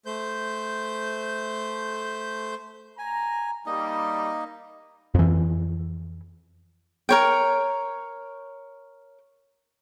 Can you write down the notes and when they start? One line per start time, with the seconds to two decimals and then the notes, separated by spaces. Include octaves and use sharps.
0.06 A3 C5 G6
2.98 G#5 A#5
3.66 G3 A#3 D#4 D#5
5.15 F2 E3
7.09 A#4 C#5 G5